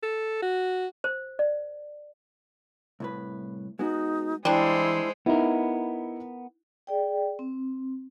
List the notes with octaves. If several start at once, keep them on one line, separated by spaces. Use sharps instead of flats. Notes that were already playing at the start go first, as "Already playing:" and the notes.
A4
F#4
C5
D5
C2 A2 B4
G#3 B3 D#4 F#4
E3 G3 G#3 D4 E4 C5
B3 D#4 E4 A#4
G#4 D5 G5
C4